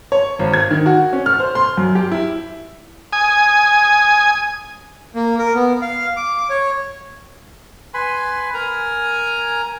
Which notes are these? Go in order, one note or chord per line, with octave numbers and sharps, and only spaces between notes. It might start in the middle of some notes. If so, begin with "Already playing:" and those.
C#5
G#1
G#6
D#3
F#4
C#4
F6
C5
C6
F#2
G4
E4
G#5 D#6
A#3
A#4
B3
F5
D6
C#5
B4 G#5 B5 C6
A#4 G#5 A#5